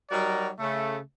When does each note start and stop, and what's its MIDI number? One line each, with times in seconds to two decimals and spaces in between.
0.11 0.50 54
0.11 0.50 55
0.11 0.50 63
0.11 0.50 66
0.11 0.50 70
0.11 0.50 74
0.60 0.98 49
0.60 0.98 57